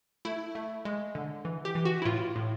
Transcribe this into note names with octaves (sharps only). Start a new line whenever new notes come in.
A3 E4
A3
G#3
D3
E3
G4
E3
F#4
E4
A2 F4
A2